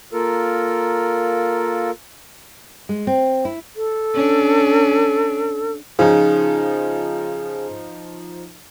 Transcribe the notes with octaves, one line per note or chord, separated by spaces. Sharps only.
A#3 F4 A4 A#4
G#3
C4
E4
A4
C#4 D4
C#3 F3 D#4